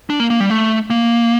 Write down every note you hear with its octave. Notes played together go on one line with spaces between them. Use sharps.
D4
A#3
A#3
G3
A3
A#3